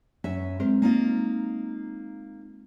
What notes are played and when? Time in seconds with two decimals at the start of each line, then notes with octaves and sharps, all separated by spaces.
0.24 F#2 C#4 E5
0.60 G#3 C4 A#4 C5
0.82 A#3 D#4 F4